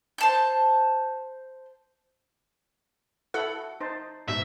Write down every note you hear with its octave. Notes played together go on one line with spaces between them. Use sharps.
C5 A5 G6
E4 F#4 A4 F#5
D#4 C5 A5
G#2 B2 E5